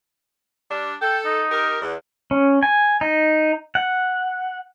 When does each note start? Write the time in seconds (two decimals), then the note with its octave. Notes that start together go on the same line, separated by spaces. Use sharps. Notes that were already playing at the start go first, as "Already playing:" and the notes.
0.70 G3 D4
1.02 A4 G5
1.25 D#4
1.51 G4 A#4
1.81 E2
2.31 C#4
2.63 G#5
3.01 D#4
3.75 F#5